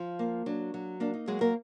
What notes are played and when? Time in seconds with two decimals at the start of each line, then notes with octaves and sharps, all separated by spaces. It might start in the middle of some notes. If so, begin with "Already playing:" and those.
Already playing: F3 F4
0.19 A#3
0.46 F#3 D4
0.74 F#3
1.00 A#3 D4
1.14 D#4
1.27 F#3 G#3 G#4
1.41 A#3 A#4